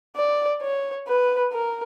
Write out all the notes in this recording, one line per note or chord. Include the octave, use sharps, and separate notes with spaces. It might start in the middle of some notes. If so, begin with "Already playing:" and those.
D5
C#5
B4
A#4